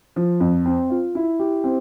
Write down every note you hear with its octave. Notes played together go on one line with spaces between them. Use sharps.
F3
F2
C4
F4
E4
G4
C4